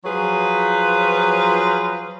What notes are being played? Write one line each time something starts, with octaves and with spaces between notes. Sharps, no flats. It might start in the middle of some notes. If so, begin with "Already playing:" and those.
F3 F#3 F4 G#4 B4